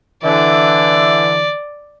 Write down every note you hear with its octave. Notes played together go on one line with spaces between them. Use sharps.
D3 E3 D5